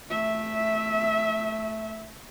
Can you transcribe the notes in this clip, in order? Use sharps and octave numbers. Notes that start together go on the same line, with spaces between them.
A3 E5